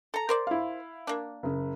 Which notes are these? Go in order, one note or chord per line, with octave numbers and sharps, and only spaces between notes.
A4 A#5
A#4 C5 D5
E4 F5
A#3 D4
F#1 C#3